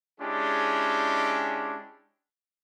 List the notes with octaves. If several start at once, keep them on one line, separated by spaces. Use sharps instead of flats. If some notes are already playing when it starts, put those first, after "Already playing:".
G#3 C#4 D4 E4 G4 G#4